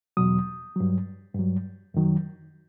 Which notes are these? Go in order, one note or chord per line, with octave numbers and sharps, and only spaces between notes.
E2 B2 F#3 D#6
G2 F#3
G2 F#3
F#2 D#3 F#3